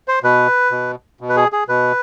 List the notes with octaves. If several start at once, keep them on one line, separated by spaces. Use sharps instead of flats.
C5
B2 B4
B2
B2
B4
G#4
G#4
B2 B4